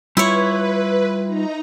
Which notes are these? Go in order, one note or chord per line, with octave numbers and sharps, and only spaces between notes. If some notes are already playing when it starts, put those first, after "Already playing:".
G3 E4 F4 B4 C#5
D#4 A#5